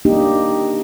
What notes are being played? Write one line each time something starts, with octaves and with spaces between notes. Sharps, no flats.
A#3 D4 D#4 G4